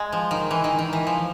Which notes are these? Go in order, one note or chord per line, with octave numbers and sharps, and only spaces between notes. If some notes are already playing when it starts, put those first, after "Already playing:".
Already playing: G#3
F3
D#3
E3
D#3
D#3
E3
F3